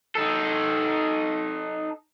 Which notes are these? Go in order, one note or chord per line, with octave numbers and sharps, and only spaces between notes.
D#4 A4